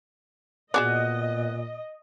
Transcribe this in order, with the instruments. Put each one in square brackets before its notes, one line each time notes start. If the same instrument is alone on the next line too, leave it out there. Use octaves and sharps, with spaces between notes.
[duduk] A#2 [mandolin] B3 [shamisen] F#4 G#4 D5 [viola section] D#5